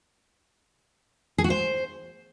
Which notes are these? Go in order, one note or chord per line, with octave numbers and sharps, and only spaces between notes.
G#4
F#4
C5